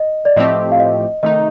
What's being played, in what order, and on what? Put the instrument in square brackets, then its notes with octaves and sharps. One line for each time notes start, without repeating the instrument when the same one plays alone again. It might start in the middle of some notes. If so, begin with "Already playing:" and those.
Already playing: [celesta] D#5
D5
[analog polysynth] A2 F3 A3 C4 G4 [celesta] D#5
[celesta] F5
D#5
[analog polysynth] C3 D#3 A3 D#4 [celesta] D#5